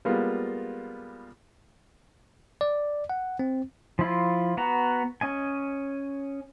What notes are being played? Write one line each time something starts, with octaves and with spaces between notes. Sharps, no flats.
G3 G#3 A#3 B3 F4
D5
F#5
C4
F3 E4 F4
B3 F#4 A#5
C#4 D#5 G#5